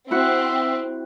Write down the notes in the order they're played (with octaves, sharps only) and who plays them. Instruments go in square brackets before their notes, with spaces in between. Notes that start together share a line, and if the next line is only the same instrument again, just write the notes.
[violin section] C4 [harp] E4 F#4 F#5 [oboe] E5